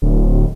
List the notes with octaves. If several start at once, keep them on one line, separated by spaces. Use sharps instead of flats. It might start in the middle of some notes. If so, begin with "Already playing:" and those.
D1